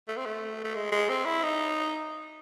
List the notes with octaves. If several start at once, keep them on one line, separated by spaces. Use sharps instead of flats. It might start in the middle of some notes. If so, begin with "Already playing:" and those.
A3
C4
A3
A3
G#3
G#3
C4
E4
D#4